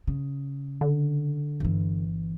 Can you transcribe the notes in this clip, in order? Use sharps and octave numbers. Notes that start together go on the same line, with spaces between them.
C#3
D3
G1 E3